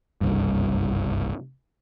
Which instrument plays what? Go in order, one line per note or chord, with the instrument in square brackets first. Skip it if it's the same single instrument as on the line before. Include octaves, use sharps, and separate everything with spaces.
[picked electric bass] F#1 C2 G2